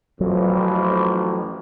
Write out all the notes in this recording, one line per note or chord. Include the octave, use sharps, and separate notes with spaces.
A1 F2 F#3